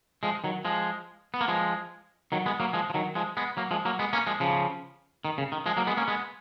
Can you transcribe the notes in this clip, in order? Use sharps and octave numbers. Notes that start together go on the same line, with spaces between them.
F3 G#3
D#3 F#3
F3 G#3
B3
A#3
F3 G#3
D#3 F#3
G#3 B3
F#3 A#3
F3 G#3
F3
D#3 F#3
F3 G#3
G#3 B3
F#3 A#3
F3 G#3
F#3 A#3
G#3 B3
A#3 C#4
F3 G#3
C#3 F3
D#3
C#3
D#3
F3 G#3
F#3 A#3
G#3 B3
A#3 C#4
G#3 B3